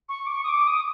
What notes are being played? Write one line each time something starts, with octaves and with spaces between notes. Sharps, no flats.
C#6
D6
C#6
D#6
D6
D#6